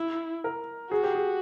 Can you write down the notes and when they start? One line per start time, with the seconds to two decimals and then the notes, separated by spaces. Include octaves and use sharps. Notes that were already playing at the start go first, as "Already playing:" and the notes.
Already playing: E4
0.44 A#4
0.91 F#4 G#4
1.03 G4
1.15 G#4